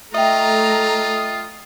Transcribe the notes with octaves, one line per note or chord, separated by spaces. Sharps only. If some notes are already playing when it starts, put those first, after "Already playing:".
A3 F4 D#5 E5 G5 A#5